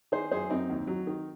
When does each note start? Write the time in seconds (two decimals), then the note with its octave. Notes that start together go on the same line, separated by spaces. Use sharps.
0.12 D#3 G#4 C5
0.31 F#2 G#4 C5
0.50 F#2 C4 D#4
0.70 D#2
0.87 F#3
1.07 D#3